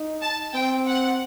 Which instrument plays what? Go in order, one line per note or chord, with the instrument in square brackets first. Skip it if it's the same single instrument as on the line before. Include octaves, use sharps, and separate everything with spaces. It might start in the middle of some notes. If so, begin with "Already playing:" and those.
Already playing: [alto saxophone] D#4
[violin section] A5
[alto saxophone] C4 [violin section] G5
[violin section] F#5